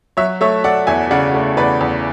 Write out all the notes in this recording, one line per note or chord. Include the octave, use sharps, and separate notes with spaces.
F#3 C#5 E5
A3 C#5 E5
A3 D5 F#5
E2 E5 G#5
C#3 D5 F#5
A3
E2 B4 D5
E2